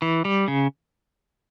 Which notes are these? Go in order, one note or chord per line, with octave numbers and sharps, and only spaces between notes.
E3
G3
C#3